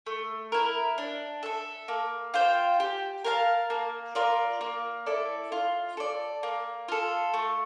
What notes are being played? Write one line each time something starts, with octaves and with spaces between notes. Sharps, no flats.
A3
E4 A#4
D4
A4 E5
A#3
F4 C5 G5
G4
A#4 F5 A5
A#3
F4 A#4 D5
A#3
E4 A4 D5
F4
A4 D5
A#3
F4 A4
A3